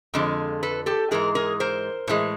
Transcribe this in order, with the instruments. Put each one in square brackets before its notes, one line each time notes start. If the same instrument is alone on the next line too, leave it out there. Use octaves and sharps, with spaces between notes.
[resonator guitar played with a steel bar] F2 D3 F3 G#3
A4 B4
G4 A4
G#2 E3 G#3 G#4 A#4
G#4 A#4
A#4 C5
A2 E3 G#3